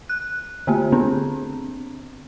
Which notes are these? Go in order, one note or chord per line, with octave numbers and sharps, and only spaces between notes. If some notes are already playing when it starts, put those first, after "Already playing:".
F#6
D3 A3 A#3 F4 G4
D3 B3 C4 D4